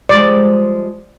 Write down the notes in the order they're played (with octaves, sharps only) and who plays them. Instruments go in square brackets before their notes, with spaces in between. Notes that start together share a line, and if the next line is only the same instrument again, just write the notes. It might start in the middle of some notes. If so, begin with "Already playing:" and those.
[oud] F3 G3 G#3 [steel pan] D5